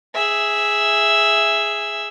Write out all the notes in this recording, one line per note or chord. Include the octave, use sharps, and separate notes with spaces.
G#4 E5